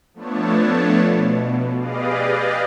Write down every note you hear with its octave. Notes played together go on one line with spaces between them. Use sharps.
F3 A3 B3 D4 C#5 A5
B2
G4 G#4 B4 D5 D#5 F5